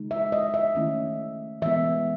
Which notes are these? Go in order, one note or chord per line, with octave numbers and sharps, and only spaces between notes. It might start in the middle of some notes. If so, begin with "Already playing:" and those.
Already playing: C#3 G#3 D#4
E5
D#5
E5
D#3 A3 C#4 E4
E3 G#3 B3 E5